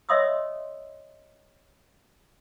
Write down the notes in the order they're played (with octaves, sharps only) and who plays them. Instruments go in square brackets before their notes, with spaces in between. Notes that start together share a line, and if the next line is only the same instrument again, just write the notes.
[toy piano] C#5 D#5 E5 C6 D#6 E6